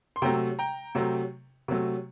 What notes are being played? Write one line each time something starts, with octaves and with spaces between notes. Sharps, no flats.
C6
C3 F#3 A3 G5 A#5
G5 A#5
C3 F#3 A3
C3 F#3 A3